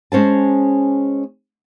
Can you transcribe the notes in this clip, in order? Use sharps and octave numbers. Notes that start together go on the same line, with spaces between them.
G#3 C#4 C5 A5